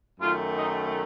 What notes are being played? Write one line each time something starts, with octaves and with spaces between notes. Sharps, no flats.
F#2 D#3 A3 F4
D#4